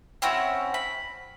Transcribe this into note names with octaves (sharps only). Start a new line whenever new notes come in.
C4 C#4 E4 F#4
B5